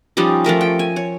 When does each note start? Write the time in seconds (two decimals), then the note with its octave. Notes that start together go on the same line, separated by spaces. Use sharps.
0.17 F3 G3 C#4 D#4
0.44 F3 A3 A#4 E5
0.61 G5
0.79 G#5
0.96 C#5